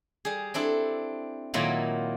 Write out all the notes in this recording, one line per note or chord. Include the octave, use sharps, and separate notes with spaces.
G3 G#4
C4 D4 E4 A4
A#2 D#3 F#3 A#3 E4 F4